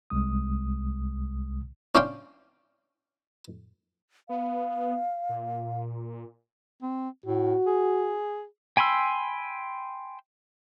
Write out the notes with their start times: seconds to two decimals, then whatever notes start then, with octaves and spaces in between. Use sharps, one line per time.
0.10 C2 G#3 D#6
1.95 C#4 D4 F5 G5 C6
4.29 B3 F5
5.29 A#2
6.82 C4
7.26 A2 F#4
7.67 G#4
8.77 G5 G#5 B5 C6 E6